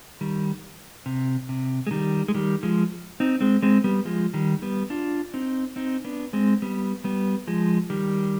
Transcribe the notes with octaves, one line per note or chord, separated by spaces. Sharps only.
D#3 G3
C3
C3
G#3
D#3 G3
G#3
D#3 G3
F3 G#3
C4 D#4
G#3 C4
G#3 C4
G3 B3
F3 G#3
D#3 G3
G3 B3
D4 F4
C4 D#4
C4 D#4
B3 D4
G#3 C4
G3 B3
G3 B3
F3 G#3
D#3 G3